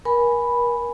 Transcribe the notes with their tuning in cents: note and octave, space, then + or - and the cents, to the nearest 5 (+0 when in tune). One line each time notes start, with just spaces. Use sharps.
A#4 +35 G#5 +0 B5 +0